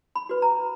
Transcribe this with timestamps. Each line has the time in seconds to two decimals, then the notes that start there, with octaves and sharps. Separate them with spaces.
0.15 B5
0.29 F#4 B4
0.42 A#5